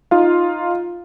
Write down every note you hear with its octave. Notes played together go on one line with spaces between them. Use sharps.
D#4 F4 F5